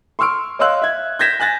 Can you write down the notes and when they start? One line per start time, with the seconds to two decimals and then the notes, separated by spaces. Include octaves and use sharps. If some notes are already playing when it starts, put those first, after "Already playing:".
0.19 C6 C#6 E6 F6 D7
0.59 C#5 D#5 F5 C6 E6 F#6
0.82 E5 G#6
1.19 G6 G#6 A#6 B6 E7
1.39 G#5 F#6 A6 A#6